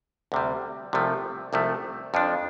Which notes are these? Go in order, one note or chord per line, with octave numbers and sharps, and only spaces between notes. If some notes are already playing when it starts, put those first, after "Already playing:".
D2 C3 G3
C2 C3 F3 A3
C2 C3 F3 A3
F2 F3 D4